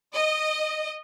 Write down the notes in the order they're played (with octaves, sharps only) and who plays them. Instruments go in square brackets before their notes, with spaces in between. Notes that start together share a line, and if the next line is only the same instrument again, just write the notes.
[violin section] D#5